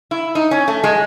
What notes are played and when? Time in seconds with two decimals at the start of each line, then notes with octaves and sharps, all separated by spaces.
0.11 E4
0.35 D#4
0.51 C#4
0.68 A3
0.84 G#3